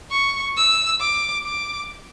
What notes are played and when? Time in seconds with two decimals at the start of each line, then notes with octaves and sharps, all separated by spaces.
0.11 C#6
0.56 E6
1.00 D6
1.45 D6